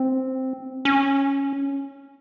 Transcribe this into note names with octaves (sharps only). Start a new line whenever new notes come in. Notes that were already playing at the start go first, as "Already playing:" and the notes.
Already playing: C4
C#4